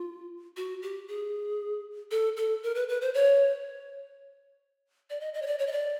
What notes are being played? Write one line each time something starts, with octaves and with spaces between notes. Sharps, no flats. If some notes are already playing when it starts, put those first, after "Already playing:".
Already playing: F4
F#4
G4
G#4
A4
A4
A#4
B4
B4
C5
C#5
D5
D#5
D#5
C#5
D5
C#5
D#5
D5